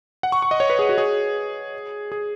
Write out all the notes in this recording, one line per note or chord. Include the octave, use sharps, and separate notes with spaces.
F#5
C#6
C#6
D#5
C#5
B4
G#4
F#4
G#4
G#4